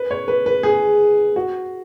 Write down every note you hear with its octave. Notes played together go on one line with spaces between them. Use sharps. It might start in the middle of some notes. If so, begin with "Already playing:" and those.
Already playing: B4
C#5
B4
B4
G#4
F#4